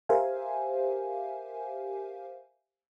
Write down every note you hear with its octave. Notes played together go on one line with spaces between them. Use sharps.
G4 A#4 C5 E5 F5 G#5